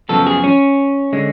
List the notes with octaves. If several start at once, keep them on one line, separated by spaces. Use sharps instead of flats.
F#2 C#3 F3 B3 A4
G#4
C#4
D3 G#3